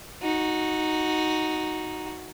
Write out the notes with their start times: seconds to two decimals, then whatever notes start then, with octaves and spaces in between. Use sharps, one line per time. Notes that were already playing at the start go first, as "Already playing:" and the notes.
0.22 D#4 F#4